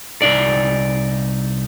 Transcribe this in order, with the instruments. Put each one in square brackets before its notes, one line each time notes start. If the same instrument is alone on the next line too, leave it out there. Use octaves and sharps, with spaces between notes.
[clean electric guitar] C2 D#4 D5